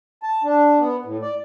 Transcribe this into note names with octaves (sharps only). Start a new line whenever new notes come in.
A5
D4
B3
A2
D5